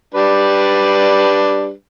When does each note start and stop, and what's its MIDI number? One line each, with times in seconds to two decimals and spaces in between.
0.15 1.72 55
0.15 1.72 62
0.15 1.72 71